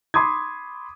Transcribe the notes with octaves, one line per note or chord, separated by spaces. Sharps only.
B5 C6 D6 D#6 G#6